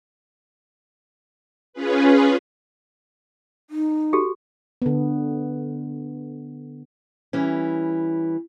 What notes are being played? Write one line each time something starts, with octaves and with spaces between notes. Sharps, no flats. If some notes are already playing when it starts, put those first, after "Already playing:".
C#4 F4 G#4 B4
D#4
F#4 G4 A4
D3 B3
E3 G3 C#4